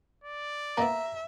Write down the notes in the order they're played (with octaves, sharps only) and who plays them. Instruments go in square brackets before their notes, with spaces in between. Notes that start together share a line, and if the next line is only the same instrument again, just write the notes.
[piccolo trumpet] D5
[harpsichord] A#3 B3 [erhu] E5 [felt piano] A#5